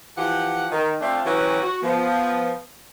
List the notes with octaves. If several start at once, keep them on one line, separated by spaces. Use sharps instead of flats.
E3 F3 G4 F#5
D#3
A3 C4 D4 F4 E5
E3 F#3 C#4 F#4 G4 B4
F#4
F3 B3